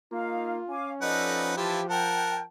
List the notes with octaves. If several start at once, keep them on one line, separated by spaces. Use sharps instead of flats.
A#3 D#4 F4 F5
C#4 F5 G#5 D6
F3 D#4 A4 B4 D5 D#5 F#5
E3 E4 F4 G4 A5
A#4 F#5 G5 A5